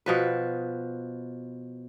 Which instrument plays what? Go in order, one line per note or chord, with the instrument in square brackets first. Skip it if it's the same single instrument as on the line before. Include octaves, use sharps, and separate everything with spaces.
[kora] B2 F3 B4